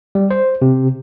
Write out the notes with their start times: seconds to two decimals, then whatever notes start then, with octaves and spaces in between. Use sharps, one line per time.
0.15 G3
0.31 C5
0.62 C3